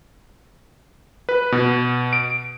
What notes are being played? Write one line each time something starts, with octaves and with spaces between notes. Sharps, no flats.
B4
B2
D7